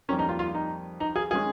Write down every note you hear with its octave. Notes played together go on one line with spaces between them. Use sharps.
F2 D#3 G3 A#3 C#4
D#4
F4
F4
D#4
D#4
G#4
D#3 G#3 C#4 G#4